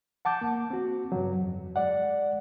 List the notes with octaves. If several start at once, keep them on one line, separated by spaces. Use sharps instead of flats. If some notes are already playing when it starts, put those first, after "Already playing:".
F#5 A5 D6 G6
A#3
C4 F#4
G2 C#3 F#3
F2
G#3 D5 F#5